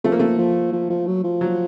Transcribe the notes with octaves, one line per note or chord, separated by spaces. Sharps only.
F3 A3
A#3
A3
F3
F3
F3
F#3
F3
F#3